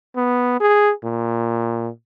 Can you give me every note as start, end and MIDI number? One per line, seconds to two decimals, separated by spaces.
0.16 0.60 59
0.60 0.92 68
1.04 1.89 46